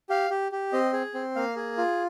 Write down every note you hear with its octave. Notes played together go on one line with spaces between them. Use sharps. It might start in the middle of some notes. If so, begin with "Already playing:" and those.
G4 F5
G4
G4
C4 D#5
G#4
C4
A#3 F5
G#4
F4